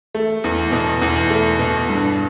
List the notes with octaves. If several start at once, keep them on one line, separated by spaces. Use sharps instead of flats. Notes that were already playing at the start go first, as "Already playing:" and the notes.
A3
E2
B2
E2
A3
B2
G2